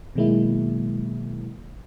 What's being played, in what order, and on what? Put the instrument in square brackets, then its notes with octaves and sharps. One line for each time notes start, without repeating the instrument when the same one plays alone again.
[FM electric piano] B2 D#3 F#3 G#3 A#3 E4